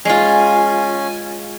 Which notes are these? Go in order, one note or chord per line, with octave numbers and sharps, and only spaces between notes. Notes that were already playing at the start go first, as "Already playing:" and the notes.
G#3 C#4 F4 G#5